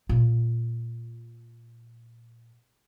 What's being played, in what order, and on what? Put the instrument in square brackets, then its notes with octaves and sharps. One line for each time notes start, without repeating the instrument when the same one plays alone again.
[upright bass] A#2 F4